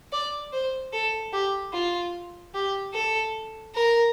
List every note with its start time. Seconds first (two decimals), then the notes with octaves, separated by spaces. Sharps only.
0.12 D5
0.53 C5
0.93 A4
1.33 G4
1.73 F4
2.54 G4
2.93 A4
3.75 A#4